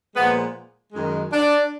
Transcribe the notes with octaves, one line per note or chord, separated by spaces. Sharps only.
A#2 F3 G#3 B3
F#2 D#3 G#3
D4